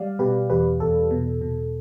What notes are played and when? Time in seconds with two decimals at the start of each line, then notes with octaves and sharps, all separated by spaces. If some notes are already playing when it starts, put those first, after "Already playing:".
Already playing: G3 D5 F5
0.19 B2 G4 B4
0.50 E2 G4 B4
0.80 E2 A4
1.11 B2
1.41 B2